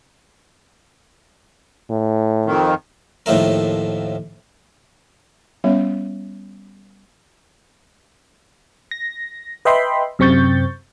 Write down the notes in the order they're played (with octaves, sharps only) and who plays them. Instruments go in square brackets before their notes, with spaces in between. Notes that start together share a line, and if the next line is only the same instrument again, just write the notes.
[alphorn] A2
[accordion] F2 D#3
[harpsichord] D#2 A2 F3 A3 A#4
[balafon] G3 B3 C#4 C#5 E5
[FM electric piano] A#6
B4 D#5 E5 G5 B5 C6
F#2 C3 C4 C#6 G6 A6